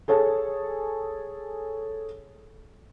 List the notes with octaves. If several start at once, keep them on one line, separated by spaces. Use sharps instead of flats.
G#4 A4 C#5 A5